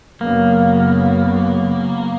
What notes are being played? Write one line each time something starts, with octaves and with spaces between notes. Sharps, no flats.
F#2 C#3 F#3 A#3 B3